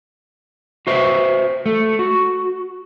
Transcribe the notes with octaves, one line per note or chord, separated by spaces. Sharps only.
F#4 B4 C5 D#5 E5
A3
F#4